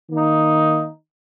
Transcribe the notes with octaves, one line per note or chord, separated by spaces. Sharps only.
D#3 A#3 D#4